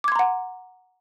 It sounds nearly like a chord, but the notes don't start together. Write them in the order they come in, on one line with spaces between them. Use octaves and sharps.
D6 G#6 C6 A#5 F#5